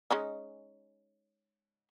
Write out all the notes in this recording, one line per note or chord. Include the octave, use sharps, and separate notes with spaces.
G#3 C#4 D#4